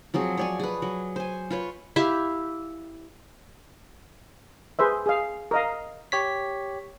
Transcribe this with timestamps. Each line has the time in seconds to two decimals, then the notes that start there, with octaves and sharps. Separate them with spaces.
0.14 F3 F#3 C4 G#4
0.37 C#5 D5 G#5
0.59 G#4 B4
0.82 F#3
1.16 C5 G#5
1.51 F4 B4 C#5
1.96 E4 G4 E5 F5
4.79 G#4 B4 C5 E5
5.06 G#4 F5
5.51 A#4 D#5 F5
6.12 G4 C#5 B6